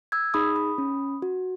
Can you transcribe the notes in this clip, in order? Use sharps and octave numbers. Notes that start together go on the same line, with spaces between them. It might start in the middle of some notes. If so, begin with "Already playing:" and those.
E6 G#6
D#4 G#4 B5 D#6
B5 D#6
C#4
F#4